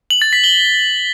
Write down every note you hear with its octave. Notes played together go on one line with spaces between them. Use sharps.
F#7
A6
B6
G7